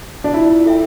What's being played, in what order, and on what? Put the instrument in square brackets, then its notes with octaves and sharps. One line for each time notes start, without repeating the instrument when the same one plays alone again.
[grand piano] D4
[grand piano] E4 [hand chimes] F4
[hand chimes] A4 E5 G5